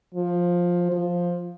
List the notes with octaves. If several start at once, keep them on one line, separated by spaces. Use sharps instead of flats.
F3
F3